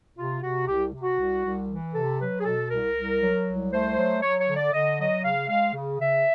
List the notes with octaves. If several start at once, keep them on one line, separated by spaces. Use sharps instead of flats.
C3 F4
C3 F#4
C2 G4
C3
F#4
C2
C2
E3
C3 A4
F#3 B4
G#4
B2 A4
C2 A#4
C2
F#3
C2
A3 C5
F#3
F#3 C#5
C#5
D3
D5
D3 D#5
F#3 D#5
C#3 F5
G#3 F5
C#3
C#3 E5